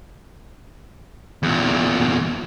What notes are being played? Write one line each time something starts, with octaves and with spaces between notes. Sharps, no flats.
E2 A#2